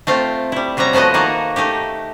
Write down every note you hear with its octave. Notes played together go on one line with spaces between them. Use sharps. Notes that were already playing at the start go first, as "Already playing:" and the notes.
A3 C4 F4
G3 E4
C3 F#3 G3 E5 A#5
F3 A3 B3 F#4 D#5
D#3 A#3 F#4 A4
A3 D#4 G4